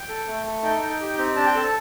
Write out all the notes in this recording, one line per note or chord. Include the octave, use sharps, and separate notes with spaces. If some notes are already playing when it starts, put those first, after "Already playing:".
Already playing: G5
A4
A3
A4
D#4 G5
D#4
G4
C4
D4 A5
G5
A4 A5